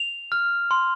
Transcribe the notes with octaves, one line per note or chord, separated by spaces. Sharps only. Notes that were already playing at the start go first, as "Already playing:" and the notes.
Already playing: F7
F6
C6